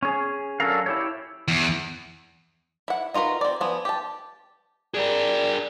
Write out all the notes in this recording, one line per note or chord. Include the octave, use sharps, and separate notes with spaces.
C#4 G#4
F#3 C#4 D4 A4 A#4 F5
E4 G4 C#5
E2
E4 F#5
D#4 F4 F#4 A#4 B4
C4 D5
F3 B3 G#5
G4 A5
D4 G4 G#4 A#4 D5